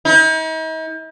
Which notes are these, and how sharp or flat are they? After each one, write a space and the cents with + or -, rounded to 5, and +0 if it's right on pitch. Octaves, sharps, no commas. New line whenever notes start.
D#4 +45